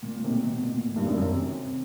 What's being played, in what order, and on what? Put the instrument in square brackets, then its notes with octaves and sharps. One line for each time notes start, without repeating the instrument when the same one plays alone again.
[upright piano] A#2
A#2
C3
B2
B2
A#2
A#2
A2
G2
F#2
F#2
C3